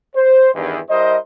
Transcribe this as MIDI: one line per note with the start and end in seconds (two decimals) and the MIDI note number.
0.15 0.50 72
0.55 0.78 40
0.55 0.78 43
0.55 0.78 51
0.89 1.17 55
0.89 1.17 64
0.89 1.17 70
0.89 1.17 72
0.89 1.17 75